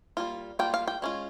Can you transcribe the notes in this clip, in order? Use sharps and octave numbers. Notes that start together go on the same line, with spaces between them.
G3 A#3 F4
G3 A#3 F4 G5
F5
G5
G#3 C#4 F4